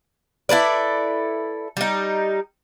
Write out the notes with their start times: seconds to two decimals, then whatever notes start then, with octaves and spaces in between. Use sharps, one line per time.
0.49 E4 A4 B4 D5
1.77 G3 D#4